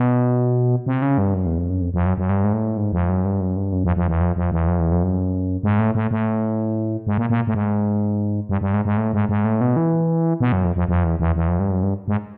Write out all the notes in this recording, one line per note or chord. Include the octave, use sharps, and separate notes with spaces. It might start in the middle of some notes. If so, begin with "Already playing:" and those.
Already playing: B2
C3
C#3
G2
F#2
E2
F2
F#2
F2
F2
F#2
F#2
G2
G#2
A2
G#2
F2
F#2
G2
F#2
G2
F#2
F2
F2
E2
F2
F2
E2
F2
E2
F2
F#2
G#2
A2
A2
A2
G#2
A#2
A#2
A2
G#2
G2
G2
G#2
G#2
A2
G#2
G#2
A2
B2
E3
B2
F#2
F2
F2
F2
E2
E2
E2
F2
G2
F#2
G2
G#2